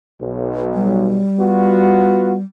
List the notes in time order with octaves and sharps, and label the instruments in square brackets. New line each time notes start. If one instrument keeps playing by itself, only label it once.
[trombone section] B1
[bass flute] G3
[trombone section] B3 F4 F#4